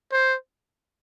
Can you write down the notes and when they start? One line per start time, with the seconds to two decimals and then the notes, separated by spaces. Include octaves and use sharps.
0.12 C5